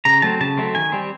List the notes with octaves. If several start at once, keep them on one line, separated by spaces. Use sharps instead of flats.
C#3 A#5
F#3 A3 C4 A5
C#3 A5
F#3 A3 C4
D#3 G#5
G3 C4